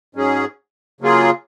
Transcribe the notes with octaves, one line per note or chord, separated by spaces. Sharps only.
G#2 F#3 C#4 G#4
C#3 F#3 A#3 F4 G#4